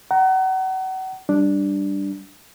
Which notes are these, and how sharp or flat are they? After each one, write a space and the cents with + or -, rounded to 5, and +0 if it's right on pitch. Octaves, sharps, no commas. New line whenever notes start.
F#5 +35 A#5 +0
G3 +0 D4 +0